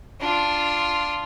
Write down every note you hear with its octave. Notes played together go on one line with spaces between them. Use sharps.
D4 F4